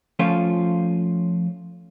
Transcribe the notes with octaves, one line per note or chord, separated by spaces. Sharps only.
F3 A3 C#4 F4